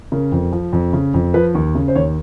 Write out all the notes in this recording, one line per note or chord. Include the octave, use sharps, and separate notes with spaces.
C#3 A#4
F2
F3
F2
C#3
F2
F3 B4
D#2
C#3
C5
D#2 C#5